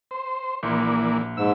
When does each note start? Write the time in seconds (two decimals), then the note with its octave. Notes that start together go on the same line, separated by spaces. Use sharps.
0.11 C5
0.63 A#1 E3 A#3 D5 C6
1.37 G#2 E6